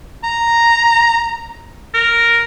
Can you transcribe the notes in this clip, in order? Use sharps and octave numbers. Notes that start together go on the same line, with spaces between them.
A#5
A#4